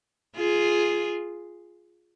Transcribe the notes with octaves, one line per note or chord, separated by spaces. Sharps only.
F4 G#4